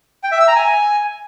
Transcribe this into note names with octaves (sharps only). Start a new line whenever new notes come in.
G5
E5
E6
A#5
G#5